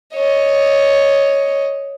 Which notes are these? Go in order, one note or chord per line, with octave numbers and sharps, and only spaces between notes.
C#5 D#5